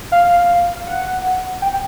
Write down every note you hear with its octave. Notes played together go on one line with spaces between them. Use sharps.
F5
F#5
G5